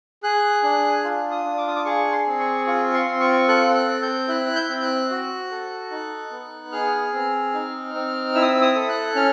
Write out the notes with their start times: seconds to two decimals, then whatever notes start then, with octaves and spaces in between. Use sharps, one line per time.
0.23 G#4 F#6
0.63 D4 F#6
1.04 F4
1.31 D#6
1.45 D4
1.58 D6
1.68 D#6
1.76 D6
1.85 G#4 C#6
2.12 C6
2.26 C4
2.39 C#6
2.67 F4 C#6
2.93 C6
3.07 C4
3.20 C#6
3.48 A4 F#6
3.74 F#6
3.88 C4
4.02 G6
4.28 E4 F#6
4.56 G6
4.69 C4
4.82 F#6
5.10 F#4
5.51 A4
5.91 D#4
6.31 B3
6.72 G#4 F6
7.13 C4
7.54 D#4
7.94 C4
8.35 E4 E6
8.42 D#6
8.49 E6
8.62 D#6
8.75 A4
8.89 F#6
9.15 C#4 F6